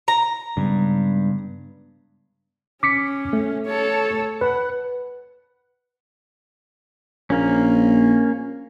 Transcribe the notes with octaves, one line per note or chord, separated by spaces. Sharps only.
A#5
G2 C#3 G#3 B3
C#4 D6 B6 C#7
A3
A4 C#5
B4 F#5
A#1 A#3 C#4